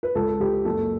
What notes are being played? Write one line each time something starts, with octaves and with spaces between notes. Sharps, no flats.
B4
C#2 A4
A4
C#2 G4
F#1 A4